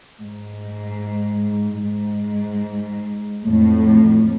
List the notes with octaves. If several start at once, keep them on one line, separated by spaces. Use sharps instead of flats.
G#2
G#2
F2 A2